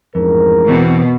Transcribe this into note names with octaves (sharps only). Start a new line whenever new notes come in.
A1 F2 G#2 A#4
E2 B2 E3 C4